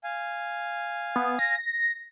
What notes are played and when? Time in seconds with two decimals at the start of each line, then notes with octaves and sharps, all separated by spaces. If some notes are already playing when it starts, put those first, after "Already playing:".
0.04 F5 G#5
1.16 B3
1.39 A#6